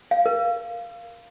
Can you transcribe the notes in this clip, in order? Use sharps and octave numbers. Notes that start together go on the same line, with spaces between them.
F5
A#4